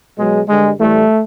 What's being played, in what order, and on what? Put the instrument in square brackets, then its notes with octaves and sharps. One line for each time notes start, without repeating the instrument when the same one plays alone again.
[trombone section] B2 F#3 G#3
G2 D3 G3 G#3
A2 E3 G3 A3